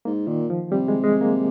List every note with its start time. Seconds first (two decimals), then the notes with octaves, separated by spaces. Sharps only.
0.05 G#2 A#3
0.27 A#2 D#3
0.50 F3
0.72 C3 G3
0.88 G#3
1.04 G#3
1.21 A#3